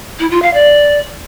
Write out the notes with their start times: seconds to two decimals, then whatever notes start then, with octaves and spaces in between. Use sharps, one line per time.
0.20 E4
0.31 F4
0.42 F5
0.54 D5